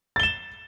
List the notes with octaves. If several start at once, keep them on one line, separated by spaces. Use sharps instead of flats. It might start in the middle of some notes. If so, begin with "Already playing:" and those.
A6 E7 G7